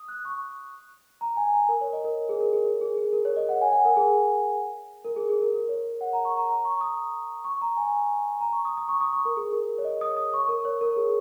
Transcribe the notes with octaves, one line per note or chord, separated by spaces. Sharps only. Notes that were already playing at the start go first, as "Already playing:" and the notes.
Already playing: D#6
F#6
C#6
A#5
G#5
A#5
A#4
C#5
D#5
A#4
G#4
A#4
G#4
A#4
G#4
G#4
A#4
C#5
D#5
F#5
G#5
F#5
A#4
G#4
A#4
G#4
G#4
A#4
A#4
C#5
F#5
A#5
C#6
A#5
A#5
C#6
D#6
C#6
A#5
G#5
A#5
C#6
D#6
D#6
C#6
D#6
C#6
A#4
G#4
A#4
C#5
D#5
D#6
D#6
C#6
A#4
C#5
A#4
G#4